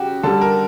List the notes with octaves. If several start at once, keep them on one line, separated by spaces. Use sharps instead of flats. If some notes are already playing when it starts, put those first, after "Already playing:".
Already playing: C#3 F#4 G4
D3 G3 A4
A#4